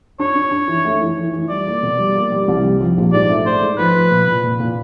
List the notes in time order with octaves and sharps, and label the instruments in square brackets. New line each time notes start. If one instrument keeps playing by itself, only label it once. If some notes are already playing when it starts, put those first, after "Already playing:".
[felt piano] D4 [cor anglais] C#5
[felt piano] D4
D4
E3
A3
E3
E3
E3
[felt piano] G3 [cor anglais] D5
[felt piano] A#3
B2
G3
A#3
G3
C2
G3
F3
A#1
[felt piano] G#2 [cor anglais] D5
[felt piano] A3
[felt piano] A3 [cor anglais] C5
[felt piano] G#2
[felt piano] F3 [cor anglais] B4
[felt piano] F3
A#2
A#2
A#2
A#2